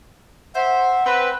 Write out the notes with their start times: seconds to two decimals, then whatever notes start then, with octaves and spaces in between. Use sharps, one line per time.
0.55 C5 E5 F#5
1.05 C4 B4